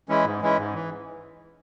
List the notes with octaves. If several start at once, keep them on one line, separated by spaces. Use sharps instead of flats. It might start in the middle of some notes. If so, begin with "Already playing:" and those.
E3 G#3 C#4 E4
G#2
E3 G#3 C#4 E4
G#2
E3